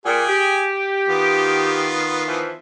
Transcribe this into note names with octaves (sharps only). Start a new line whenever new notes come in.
A#2 G#4 G5 G#5
G4
D#3 B3 F4
E3 F3